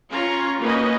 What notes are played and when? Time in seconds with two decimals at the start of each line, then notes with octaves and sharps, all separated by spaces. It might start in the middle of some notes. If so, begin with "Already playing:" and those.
0.11 C#4 F4 C#5 A#5
0.59 A#3 C#4 D#4 F#4 B4 D#5